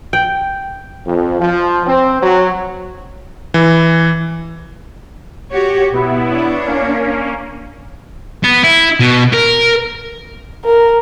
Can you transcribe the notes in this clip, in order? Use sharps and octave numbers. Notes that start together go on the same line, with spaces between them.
G5
F2
F3
C4
F#3
E3
F#4 G4 C#5
B2 B3 E4
D4 C#5
A#3 C#4
B3
E4
B2
A#4
A#4